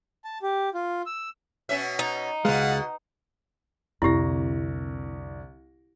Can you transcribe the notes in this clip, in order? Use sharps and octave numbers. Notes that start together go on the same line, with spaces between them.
A5
G4
F4
E6
B2 C#4 E5
D#4
C#2 B2 G#3 F5 F#5
C2 F2 D3 E4 G4 A#6